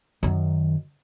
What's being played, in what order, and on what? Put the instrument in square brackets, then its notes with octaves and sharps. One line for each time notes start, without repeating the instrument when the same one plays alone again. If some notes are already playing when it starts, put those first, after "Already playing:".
[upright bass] F#2 D#3